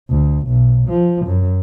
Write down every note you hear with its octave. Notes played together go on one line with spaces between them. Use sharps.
D2
B1
F3
F#2